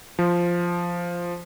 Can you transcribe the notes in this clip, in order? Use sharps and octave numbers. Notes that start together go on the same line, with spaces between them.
F3